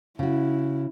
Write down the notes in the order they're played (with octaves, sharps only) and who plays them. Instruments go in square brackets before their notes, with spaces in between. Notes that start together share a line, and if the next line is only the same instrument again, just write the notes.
[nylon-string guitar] C#3 F#4 [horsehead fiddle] E4